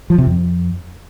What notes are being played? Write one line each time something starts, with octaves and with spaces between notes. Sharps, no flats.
F3
C3
F2